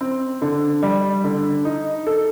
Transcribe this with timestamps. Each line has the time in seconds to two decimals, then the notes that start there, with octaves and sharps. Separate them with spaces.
0.01 C4
0.42 D3
0.83 G3
1.24 D3
1.65 D#4
2.07 A4